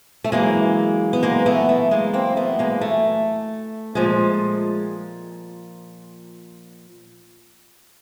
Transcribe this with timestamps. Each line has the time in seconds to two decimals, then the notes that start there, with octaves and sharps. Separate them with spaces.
0.24 A3
0.32 F#2 C#3 E3 G#3 A#3
1.13 B3
1.23 G#3 A#3
1.46 A3 B3
1.69 A3
1.91 G#3 A#3
2.14 A#3 C4
2.37 A3 B3
2.59 G#3 A#3
2.81 A3
3.95 A#2 F3 G#3